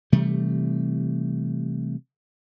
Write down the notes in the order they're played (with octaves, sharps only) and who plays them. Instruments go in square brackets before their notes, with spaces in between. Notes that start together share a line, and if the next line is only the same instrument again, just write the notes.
[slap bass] C3 E3 G3 A3